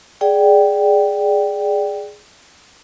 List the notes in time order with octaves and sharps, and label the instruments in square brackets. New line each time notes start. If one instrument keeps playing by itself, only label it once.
[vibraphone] G#4 D5 F#5 G5